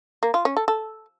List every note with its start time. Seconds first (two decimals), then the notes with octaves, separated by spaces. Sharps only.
0.23 A#3
0.34 F4
0.45 C#4
0.57 A4
0.68 A4